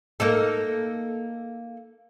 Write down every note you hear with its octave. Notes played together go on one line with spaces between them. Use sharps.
A#3 D#4 A4